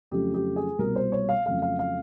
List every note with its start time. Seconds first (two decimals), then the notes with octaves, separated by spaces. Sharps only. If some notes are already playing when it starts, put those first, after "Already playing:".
0.11 F2 C#3 F#3 A3 G4
0.34 G4
0.56 G#4
0.79 C2 B2 G3 A#3 A#4
0.96 C5
1.12 C#5
1.29 F5
1.46 F2 C#3 F#3 A3 F5
1.62 F5
1.79 F5